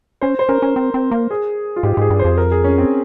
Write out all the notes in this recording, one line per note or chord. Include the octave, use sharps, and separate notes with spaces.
C#4 C5
C5
C#4 A#4
C#4
C4
C4
A#3
G#4
F4
G#2 G4
G4
G#2 G#4
G2
C5
F2
A#4
G#4
C#4
C4